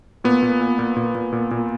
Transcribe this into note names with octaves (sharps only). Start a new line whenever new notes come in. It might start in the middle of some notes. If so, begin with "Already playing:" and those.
A#2 B3
A#2
A#2
A#2
A#2
A#2
A#2
A#2